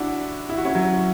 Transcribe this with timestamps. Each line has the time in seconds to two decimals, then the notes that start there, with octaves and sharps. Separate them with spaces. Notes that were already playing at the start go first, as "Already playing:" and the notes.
Already playing: D4 E4 F#4
0.49 E4
0.58 F#4
0.65 C#4 E4
0.75 F#3